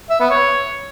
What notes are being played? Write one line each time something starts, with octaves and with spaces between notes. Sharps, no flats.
E5
B3
C#5